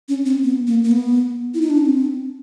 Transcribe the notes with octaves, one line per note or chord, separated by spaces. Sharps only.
C#4
C4
B3
A#3
A#3
B3
E4
D#4
D4
C#4
C4